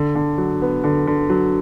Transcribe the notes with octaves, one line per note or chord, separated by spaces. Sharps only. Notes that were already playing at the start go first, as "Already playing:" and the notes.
Already playing: D3
D3
F#3
B3
D3
D3
F#3